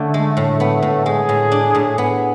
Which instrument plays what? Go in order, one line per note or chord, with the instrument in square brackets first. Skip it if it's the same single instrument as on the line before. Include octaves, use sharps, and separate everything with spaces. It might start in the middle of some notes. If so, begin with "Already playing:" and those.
Already playing: [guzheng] D3 C#4 [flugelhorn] A3
[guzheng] G#3
A2
B3
A2
[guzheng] G#3 [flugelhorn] G#4
[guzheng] A2
D4
A2
[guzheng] B3 [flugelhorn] G#4